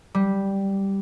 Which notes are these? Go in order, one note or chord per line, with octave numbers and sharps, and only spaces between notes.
G3